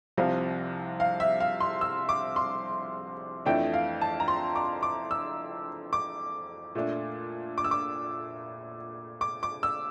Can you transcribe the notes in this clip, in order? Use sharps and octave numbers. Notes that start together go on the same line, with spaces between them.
C2 C3 F3 F5
F5
E5
F5
C6
E6
D6
C6
F2 E3 A3 D4 G5
F5
A5
A#5
C6
D6
D6
E6
D6
A#2 A3 D4
D6
E6
D6
D6
D6
E6